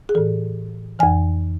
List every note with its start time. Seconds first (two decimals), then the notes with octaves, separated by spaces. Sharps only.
0.09 G#4
0.15 A2 E3 A4
0.99 F2 E3 G#5